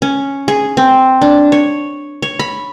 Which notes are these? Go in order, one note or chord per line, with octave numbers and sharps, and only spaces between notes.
C#4
G#4
C4
D4
C#5
C#5
B5